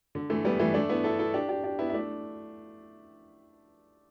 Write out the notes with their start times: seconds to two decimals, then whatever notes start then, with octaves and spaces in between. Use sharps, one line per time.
0.15 D3
0.30 E3 A3
0.45 G3 B3
0.59 E3 A3
0.74 A3 D4
0.89 B3 E4
1.04 E4 A4
1.19 E4 A4
1.34 D4 G4
1.49 D4 G4
1.64 D4 G4
1.79 B3 E4
1.90 E4
1.94 A3 D4